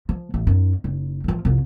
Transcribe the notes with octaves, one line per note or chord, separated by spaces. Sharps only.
F3
A1
F#2 D#4
F#1 D#4
A1 F3
C2 F2